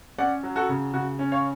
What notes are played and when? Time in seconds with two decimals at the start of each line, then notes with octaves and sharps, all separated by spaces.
0.18 C#4 D5 F#5
0.43 F#3
0.56 F#4 A4
0.69 C#3
0.94 C#3 F#4
1.19 C#4
1.32 C#5 F5